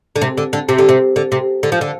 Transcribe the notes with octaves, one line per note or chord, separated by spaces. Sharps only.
D3
C3
D3
D3
C3
D3
C3
D3
C3
D3
F3
D3